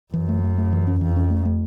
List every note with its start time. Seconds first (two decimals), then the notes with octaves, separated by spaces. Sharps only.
0.13 F#2 E3
0.29 A3
0.43 A3
0.58 A3
0.73 E3
0.87 C#4
1.01 F2 E3
1.16 C#4
1.30 A3
1.45 A3